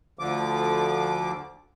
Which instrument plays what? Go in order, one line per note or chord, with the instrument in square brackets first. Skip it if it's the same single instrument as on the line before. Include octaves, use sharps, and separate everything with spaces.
[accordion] D2 D3 F3 D6